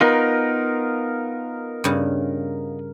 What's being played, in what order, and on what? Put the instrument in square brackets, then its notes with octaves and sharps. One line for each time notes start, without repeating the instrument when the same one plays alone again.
[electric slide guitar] B3 D#4 F4 [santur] A#4
[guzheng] G2 C#3